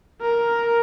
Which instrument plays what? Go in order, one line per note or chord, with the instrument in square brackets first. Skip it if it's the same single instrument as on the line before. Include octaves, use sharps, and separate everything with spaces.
[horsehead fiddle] A#4